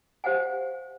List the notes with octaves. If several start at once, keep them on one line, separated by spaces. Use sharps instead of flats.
G4 C5 F5 F#5 G#5